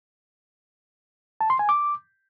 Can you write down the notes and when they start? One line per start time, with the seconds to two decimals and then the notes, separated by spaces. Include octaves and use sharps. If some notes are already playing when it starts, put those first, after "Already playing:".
1.41 A5
1.50 C6
1.59 G#5
1.69 D6